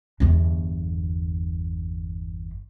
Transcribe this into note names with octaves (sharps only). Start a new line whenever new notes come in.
G1 E2